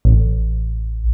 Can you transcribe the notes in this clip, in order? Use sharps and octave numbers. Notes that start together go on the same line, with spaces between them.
A1